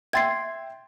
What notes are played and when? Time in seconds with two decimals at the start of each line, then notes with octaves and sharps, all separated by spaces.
0.13 E5 G5 C6 G#6 A6 C7